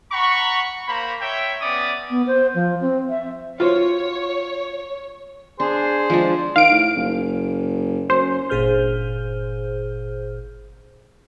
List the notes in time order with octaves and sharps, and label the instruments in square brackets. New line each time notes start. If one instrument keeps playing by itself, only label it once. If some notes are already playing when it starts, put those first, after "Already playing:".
[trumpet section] F#5 A#5 B5 C#6
A#3 C5 A#5 B5
C#5 E5 G5
B3 C#4 D5 E5 D6 D#6
[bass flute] B3
C5
F3
C4
E5
[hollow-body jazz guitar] F4 F#4 C5 [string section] C#5
[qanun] D4 [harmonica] G#4 C5
[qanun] F3 G#3 D4
[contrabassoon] D#3 [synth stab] F5 D7
[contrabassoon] A2
F#1
[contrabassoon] F#2 [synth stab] C5
[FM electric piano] G1 A#2 G#4 C5 F6 G6